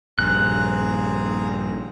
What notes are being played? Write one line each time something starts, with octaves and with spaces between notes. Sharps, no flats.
A#1 G2 C4 G#4 A#5 F#6